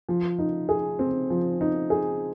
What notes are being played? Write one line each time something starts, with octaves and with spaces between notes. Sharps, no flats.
F3
D#4
G#4
C4
F3
D#4
G#4